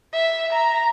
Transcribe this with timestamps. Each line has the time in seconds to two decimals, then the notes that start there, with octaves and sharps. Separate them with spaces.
0.13 E5
0.53 A#5